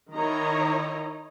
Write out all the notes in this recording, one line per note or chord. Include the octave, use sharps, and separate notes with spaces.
D#3 E4 C#5 D#5 A#5